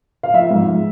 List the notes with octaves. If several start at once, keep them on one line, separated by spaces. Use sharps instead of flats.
F5
F3 E5
G#2